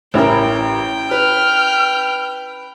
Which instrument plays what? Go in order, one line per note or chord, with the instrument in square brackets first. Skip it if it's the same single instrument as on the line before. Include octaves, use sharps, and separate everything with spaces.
[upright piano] A1 A#4 [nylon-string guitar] C#4 E4 [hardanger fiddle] G5
[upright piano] B4 [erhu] F6